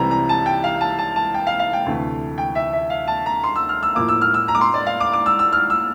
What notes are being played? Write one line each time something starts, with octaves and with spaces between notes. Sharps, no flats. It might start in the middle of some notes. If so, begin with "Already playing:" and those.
Already playing: C2 C3 E3 G3 C4 A#5
A#5
A5
G5
F5
A5
A5
A5
G5
F5
F5
G5
D2 C3 E3 A3
G5
E5
E5
F5
A5
A#5
C6
E6
F6
E6
A2 F3 A#3 D6
E6
F6
E6
A#5
D6
C6
D5
F5
D6
D6
E6
E6
F6
E6